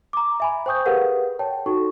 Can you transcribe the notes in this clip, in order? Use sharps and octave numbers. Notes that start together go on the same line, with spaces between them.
A#5 D6
E5 G#5 B5
C5 G5 C#6 D#6 G6
G4 G#4 A#4 B4 F5 F#5
C#5 G5 A5
D#4 F#4 A4 C#6